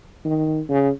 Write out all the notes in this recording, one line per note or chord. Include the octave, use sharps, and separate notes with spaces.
D#3
C#3